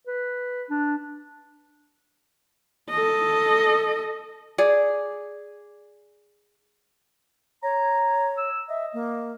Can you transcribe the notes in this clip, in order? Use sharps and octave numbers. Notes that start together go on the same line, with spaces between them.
B4
D4
A4 D#5
G#4 D5
C#5 A#5
E6
D#5 E5
A#3